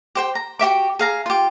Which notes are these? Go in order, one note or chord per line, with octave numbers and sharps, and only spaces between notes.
G4 C5 G5
A#5
F#4 G4 E5 D6
G#4 F5 A#5
F4 G4